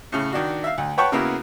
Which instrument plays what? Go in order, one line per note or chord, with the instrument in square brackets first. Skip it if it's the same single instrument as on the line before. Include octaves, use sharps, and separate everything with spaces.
[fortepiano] A2 C#3
D#3 D4 F#4
E5 F5
D2
B4 C#5 F#5 G5 A5 C#6
C#3 A#3 B3 E4 F#4